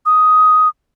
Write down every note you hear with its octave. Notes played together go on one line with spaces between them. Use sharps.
D#6